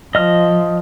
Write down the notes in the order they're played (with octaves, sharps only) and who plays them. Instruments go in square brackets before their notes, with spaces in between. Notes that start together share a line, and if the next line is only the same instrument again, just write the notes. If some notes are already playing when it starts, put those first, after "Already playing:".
[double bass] F3 [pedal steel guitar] D#5 F6